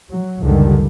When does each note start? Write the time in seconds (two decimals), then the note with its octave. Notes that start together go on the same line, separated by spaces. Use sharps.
0.11 F#3
0.41 C#2 F#2 D3 D#3 G3